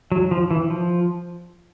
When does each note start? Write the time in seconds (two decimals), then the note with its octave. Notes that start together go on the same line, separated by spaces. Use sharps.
0.12 F#3
0.31 F3
0.51 E3
0.70 F3